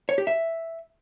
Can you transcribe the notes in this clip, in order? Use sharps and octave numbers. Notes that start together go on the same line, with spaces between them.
C#5
G4
E5